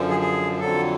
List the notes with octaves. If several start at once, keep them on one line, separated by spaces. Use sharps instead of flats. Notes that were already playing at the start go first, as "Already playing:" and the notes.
Already playing: F#2 D3 F3
G#4
G#4
F2 D3 F#3 A4